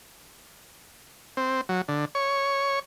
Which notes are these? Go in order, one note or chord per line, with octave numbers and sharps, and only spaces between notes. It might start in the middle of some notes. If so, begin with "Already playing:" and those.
C4
F#3
D3
C#5